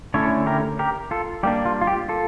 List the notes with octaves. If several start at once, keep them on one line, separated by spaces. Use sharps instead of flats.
D3 A3 C#4 E4 A4 C#5
G4 A#4
G4 A#4
F4 A4
G3 A#3 D4 G4
F4
F4
G4
F4 A4